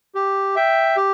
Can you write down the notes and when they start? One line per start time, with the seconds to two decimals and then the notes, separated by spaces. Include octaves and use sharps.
0.15 G4
0.56 E5 G5
0.97 G4